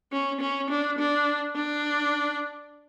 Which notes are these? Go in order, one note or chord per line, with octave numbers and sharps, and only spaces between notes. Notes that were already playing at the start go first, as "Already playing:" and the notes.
C#4
C#4
D4
D4
D4